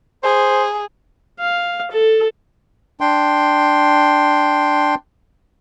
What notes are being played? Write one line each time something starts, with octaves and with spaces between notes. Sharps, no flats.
G#4 C5
F5
A4
D4 G5 C6